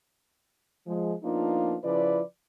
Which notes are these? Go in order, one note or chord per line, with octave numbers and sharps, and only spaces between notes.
F3 G#3
F3 A#3 B3 D4 D#4 F4
C#3 F3 E4 B4 D5